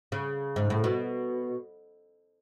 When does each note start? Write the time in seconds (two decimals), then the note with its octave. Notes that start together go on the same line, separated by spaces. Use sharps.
0.12 C#3
0.56 G#2
0.70 A2
0.84 B2